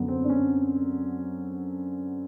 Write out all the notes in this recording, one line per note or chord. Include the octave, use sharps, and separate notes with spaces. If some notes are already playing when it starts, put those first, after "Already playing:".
Already playing: F#2 D3 B3
C4
D4
C#4